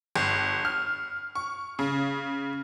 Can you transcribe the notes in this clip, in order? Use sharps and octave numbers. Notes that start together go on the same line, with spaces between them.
G1
F6
C#6
C#3